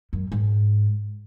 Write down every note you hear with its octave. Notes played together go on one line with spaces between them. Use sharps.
F#2
G#2